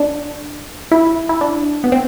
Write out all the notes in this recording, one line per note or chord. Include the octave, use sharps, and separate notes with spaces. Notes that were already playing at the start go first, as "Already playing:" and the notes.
Already playing: D4
E4
E4
D4
B3
C4